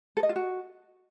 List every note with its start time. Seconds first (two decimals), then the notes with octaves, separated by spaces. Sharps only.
0.17 A4
0.23 D#5
0.29 F4
0.36 F#4